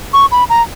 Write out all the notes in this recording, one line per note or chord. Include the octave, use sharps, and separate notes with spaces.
C#6
B5
A#5